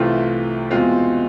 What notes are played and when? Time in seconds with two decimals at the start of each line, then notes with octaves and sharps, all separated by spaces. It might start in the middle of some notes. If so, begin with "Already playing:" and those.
Already playing: C2 C3 E3 A3 F4
0.70 E2 B2 G#3 C4 F4